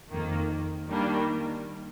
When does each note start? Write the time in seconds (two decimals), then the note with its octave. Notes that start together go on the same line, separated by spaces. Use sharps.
0.10 F2 D#3 A#3
0.89 D#3 G3 A#3 D4